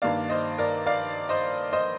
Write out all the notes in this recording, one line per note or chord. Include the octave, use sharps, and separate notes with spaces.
G2 D#3 A#3 D5 F5
C5 D#5
A#4 D5
D5 F5
C5 D#5
C5 D#5